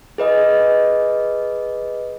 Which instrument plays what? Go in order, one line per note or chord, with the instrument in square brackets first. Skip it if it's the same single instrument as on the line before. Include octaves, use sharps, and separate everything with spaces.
[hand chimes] G#4 B4 D#5